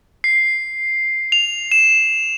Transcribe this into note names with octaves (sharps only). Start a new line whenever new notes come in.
C7
F7
E7